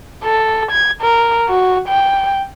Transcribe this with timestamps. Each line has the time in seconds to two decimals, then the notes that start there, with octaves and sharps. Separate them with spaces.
0.25 A4
0.72 G#6
1.02 A#4
1.49 F#4
1.89 G5